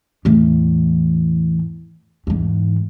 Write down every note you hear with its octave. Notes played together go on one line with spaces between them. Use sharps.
E2 A2
E2 G#2